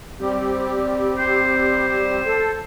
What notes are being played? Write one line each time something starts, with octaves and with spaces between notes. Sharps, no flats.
G3 C4 G4
C5
A4